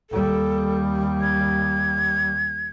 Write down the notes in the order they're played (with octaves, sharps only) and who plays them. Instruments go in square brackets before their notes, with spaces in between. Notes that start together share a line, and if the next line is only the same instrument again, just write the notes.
[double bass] D#2 G3 [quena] A4
[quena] G#6